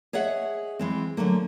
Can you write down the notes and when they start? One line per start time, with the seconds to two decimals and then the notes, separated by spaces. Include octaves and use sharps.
0.13 G#4 C#5 D#5 E5 F#5
0.79 E3 G#3 C4
1.17 D3 F#3 A3 A#3